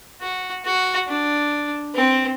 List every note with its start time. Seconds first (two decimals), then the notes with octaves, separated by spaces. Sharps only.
0.21 F#4
0.65 F#4
1.08 D4
1.95 C4